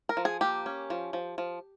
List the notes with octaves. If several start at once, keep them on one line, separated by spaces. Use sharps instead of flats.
A#4
F3
G#4
A#3 G4
C#4
F3
F3
F3